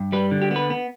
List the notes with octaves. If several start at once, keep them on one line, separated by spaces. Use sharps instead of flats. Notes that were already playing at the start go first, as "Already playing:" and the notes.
Already playing: G2
G3 B4
D3
G4
B3
B4
B3